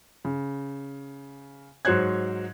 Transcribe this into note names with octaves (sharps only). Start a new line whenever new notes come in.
C#3
G#2 F#3 C5 C#5 F#6 G#6